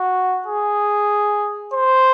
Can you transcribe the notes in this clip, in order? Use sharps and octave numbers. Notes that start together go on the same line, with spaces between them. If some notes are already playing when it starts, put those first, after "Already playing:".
Already playing: F#4
G#4
C5